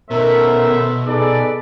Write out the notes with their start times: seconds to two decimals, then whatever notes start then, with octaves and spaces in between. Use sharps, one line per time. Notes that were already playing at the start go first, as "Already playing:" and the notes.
0.11 B2 D#3 A3 C#4 A#4 C5 E5
1.06 D#4 G#4 A4 B4 D5